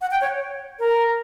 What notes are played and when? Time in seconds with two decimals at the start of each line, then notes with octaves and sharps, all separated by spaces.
0.01 F#5
0.11 G5
0.21 C#5
0.79 A#4